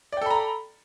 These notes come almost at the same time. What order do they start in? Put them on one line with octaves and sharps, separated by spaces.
D5 G5 A4 B5 A#5